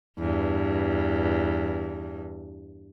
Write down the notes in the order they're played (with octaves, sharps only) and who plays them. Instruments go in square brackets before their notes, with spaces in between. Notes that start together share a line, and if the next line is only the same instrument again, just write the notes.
[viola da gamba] E2 G2